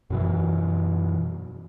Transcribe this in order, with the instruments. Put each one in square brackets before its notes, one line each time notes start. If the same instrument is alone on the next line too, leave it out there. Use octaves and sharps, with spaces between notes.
[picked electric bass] F#2 B2 E3